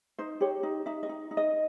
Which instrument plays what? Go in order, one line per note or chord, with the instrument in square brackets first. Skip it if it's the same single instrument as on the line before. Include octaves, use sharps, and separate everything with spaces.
[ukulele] D#4 C5
G4 C#5
D#4
D#4 E5
D#5
D#4
D#4
D#5